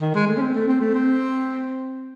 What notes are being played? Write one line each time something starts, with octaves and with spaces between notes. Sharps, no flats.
D#3
G#3
A3
C#4
C4
A3
C4
A3
C4